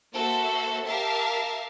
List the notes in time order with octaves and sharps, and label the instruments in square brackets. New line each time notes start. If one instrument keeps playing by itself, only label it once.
[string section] A#3 F#4 A4 C5 E5
G4 A#4 E5 F5 A5